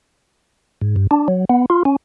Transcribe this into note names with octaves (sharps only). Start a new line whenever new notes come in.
G#2
G2
D4
F#3
B3
F4
C#4